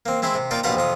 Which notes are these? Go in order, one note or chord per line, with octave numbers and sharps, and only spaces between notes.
A#3 C4
G#3 C4 E4 C5
C3
A#3 D#4 F4 D5 G5
A#1 B2 F4 G4 F#5 A#5
F2 C3 F4 D#6